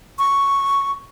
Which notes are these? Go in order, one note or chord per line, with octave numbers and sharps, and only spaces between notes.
C#6